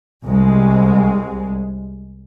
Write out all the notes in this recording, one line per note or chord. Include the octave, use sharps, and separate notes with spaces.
C2 G#3